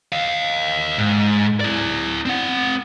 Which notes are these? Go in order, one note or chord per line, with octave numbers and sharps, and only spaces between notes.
D#5 F5
G#2
E4 D5
C4 F#5